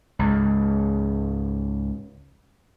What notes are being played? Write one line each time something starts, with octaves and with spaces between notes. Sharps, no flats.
C#2 G#2